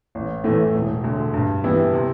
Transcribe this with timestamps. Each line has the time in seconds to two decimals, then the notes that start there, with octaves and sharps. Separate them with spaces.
0.15 A1
0.44 A2 E3 A3
0.74 E1
1.04 D2 D3
1.34 G2
1.64 E3 B3 E4 G4
1.93 C3